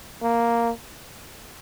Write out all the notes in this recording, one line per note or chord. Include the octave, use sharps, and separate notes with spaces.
A#3